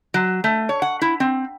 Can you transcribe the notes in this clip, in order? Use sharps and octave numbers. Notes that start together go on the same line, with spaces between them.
F#3
A3
C#5
F#5
E4
C4